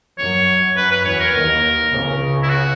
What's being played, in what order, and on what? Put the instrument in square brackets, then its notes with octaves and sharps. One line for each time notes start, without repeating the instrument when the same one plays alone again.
[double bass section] F#2 F#3 [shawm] C#5
[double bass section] F#2 F#3 [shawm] B4
[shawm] B4
[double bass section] E2 E3 [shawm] C#5
[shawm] A#4
[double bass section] D#2 D#3
C#2 C#3
[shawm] E4
F#4